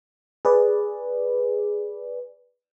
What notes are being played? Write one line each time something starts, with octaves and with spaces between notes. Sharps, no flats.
G#4 B4 D5